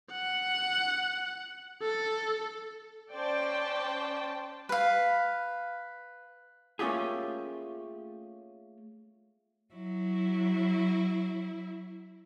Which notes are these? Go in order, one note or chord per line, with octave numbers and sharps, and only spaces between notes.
F#5
A4
C#4 C5 D5 G5 A5
B4 F5
A3 A#3 C#4 F4 G4 G#4
F#3 E4